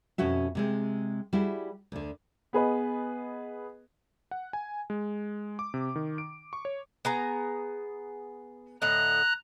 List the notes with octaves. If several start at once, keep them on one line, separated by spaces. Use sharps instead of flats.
F2 B2 C#4 F#4 E5
C3 G#3 C4
G3 E4 F#4 G#4
D2 D3
B3 G#4 B4 D#5
F#5
G#5
G#3
D6
C3
D#3
D7
C#6
C#5
B3 G#4 A#5
A2 D3 D#5 A#5 F#6